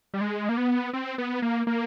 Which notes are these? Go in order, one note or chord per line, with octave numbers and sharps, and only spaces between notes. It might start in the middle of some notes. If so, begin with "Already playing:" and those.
G3
G#3
A#3
B3
C4
B3
A#3
A#3